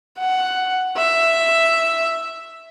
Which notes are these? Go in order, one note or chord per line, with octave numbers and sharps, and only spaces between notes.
F#5
E5